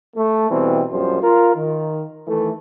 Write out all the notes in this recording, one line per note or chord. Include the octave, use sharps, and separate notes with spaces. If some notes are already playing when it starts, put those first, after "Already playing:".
A3
B2 E3 G3 C4
A#1 F#2 F3 G3 C5
F4 A#4
D#3
D#3 E3 A3